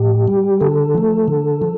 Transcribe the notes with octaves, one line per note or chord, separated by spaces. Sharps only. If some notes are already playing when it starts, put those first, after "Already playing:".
Already playing: A2 G4
G3
D3 A4
F3 A3
D3
F3